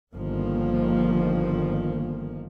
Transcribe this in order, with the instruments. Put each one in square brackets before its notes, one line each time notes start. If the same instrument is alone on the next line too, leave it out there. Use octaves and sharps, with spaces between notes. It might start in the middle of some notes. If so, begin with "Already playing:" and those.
[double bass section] G1 D#3 F3 A#3